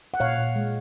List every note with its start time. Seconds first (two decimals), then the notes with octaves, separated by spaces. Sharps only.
0.14 F#5
0.20 A#2 C#5 F5
0.38 A#2
0.56 G#3